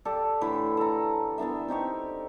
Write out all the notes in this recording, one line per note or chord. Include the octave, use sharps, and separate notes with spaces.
G4 A4 D5
A2 D3 E3 B5
A4 A#5
E3 B3 D4 E5
C4 D#4 G4 C#6